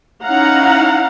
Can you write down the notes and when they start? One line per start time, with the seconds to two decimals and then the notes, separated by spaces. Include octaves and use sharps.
0.24 C#4 D#4 E4 F5 F#5 A#5